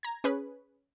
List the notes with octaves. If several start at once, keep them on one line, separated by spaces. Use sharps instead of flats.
A#5 G#6
C#4 G#4 B4